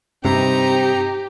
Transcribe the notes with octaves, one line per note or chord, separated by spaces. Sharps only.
G2 C3 C4 D#4 G4 A#5